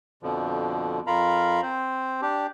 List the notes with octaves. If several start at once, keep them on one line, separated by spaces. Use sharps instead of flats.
F2 B2 D3 F3
F2 F4 A#4 F5 A#5 B5
C4 C5
D4 G4